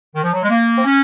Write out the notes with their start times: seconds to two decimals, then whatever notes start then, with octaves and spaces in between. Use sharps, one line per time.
0.14 D#3
0.23 F3
0.32 F#3
0.41 G#3
0.50 A#3
0.78 C4
0.84 C#4